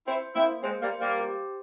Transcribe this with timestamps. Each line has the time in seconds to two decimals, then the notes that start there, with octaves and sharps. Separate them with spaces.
0.07 C4 E4 C5
0.36 A#3 C4 E4
0.63 G#3 C4 C5
0.82 G3 A#3
0.92 C5
1.01 G3 A#3
1.21 G4